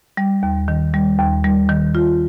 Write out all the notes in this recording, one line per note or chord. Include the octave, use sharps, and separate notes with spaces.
G3
D#2
D#3
G3
D#2
G3
D#3
F4